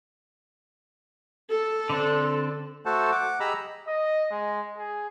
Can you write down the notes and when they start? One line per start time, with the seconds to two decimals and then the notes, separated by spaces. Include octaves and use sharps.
1.52 A4
1.90 D3 C4 D4
2.86 A3 F#4 A4 C5 F#5 A5
3.12 F#5 D6
3.40 G4 G#4 D#5 A#5 B5 E6
3.87 D#5
4.31 G#3
4.78 G#4